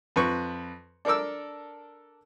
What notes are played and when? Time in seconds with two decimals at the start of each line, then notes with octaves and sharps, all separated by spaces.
0.16 F2 B4 C#6
1.05 D4 A4 A#4 D6 E6